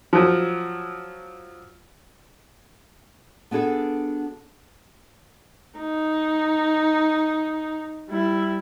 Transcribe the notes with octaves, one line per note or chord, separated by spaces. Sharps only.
F3 F#3
B3 D4 F#4 G#4 A4
D#4
G3 E4